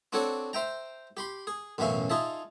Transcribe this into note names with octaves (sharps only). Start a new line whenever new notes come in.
C4 D4 F#4 A4 C#5
C5 E5 G5 A#5
G4 B5 C6
G#4
A1 F#2 B2 C#4 E5 F5
D#4 F4 G#4 E5 A5